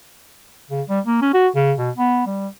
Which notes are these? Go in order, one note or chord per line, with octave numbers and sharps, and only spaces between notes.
C#3
G3
A#3
C#4
F#4
C#3
B2
B3
G3